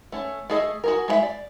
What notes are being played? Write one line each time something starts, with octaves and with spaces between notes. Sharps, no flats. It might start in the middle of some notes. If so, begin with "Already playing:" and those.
A3 C#4
A3 G#4 D#5
F#4 G#4 A#4
G#3 C5 E5
D5